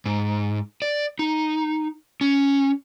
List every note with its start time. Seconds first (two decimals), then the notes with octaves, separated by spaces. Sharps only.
0.06 G#2
0.82 D5
1.19 D#4
2.21 C#4